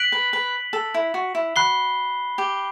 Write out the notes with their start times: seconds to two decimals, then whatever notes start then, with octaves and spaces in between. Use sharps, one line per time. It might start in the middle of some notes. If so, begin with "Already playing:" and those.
Already playing: F#6 B6 D7 F#7
0.12 B4
0.33 B4
0.73 A4
0.94 E4
1.14 F#4
1.35 E4
1.56 F#4 B5 F#6 C7 G7
2.38 G4